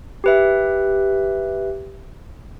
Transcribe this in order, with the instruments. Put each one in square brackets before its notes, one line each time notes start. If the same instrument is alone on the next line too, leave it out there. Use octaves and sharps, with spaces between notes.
[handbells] G4 B4 E5